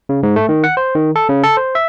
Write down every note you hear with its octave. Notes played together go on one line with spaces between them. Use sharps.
C#3
G#2
A3
D#3
F#5
C5
D#3
A4
C#3
A4
C5
E5